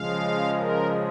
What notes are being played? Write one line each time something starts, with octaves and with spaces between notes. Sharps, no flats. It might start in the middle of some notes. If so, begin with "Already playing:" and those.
Already playing: C#3 F3 G#3 F5
A#4